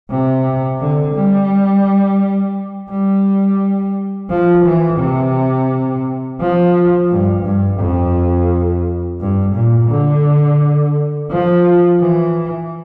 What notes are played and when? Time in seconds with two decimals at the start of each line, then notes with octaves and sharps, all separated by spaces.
0.10 C3
0.80 D3
1.15 G3
2.90 G3
4.30 F3
4.65 E3
5.00 C3
6.41 F3
7.10 G2
7.45 G2
7.81 F2
9.20 G2
9.56 A#2
9.90 D3
11.31 F3
12.00 E3